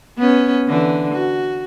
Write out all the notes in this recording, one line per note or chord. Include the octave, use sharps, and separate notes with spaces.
B3 C#4
D3 E3
F#4